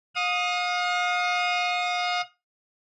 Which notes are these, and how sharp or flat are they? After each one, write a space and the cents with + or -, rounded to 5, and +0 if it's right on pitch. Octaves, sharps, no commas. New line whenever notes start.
F5 +40 D#6 +0